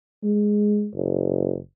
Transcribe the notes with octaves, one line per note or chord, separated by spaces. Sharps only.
G#3
F#1